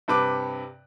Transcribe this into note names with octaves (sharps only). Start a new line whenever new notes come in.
G2 C3 B4 D6